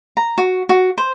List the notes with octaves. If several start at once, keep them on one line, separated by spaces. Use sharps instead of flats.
A#5
F#4
F#4
C5